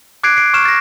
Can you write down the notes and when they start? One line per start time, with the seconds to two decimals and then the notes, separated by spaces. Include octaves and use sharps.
0.23 D6 F#6 G#6 C7 D7
0.37 C7 D7
0.54 C#6 F6 E7
0.65 A6 A#6